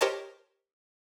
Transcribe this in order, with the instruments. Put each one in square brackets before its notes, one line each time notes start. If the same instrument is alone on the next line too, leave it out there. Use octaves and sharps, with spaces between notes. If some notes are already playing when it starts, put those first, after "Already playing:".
[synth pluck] G4 A#4 C5 C#5 D#5 A5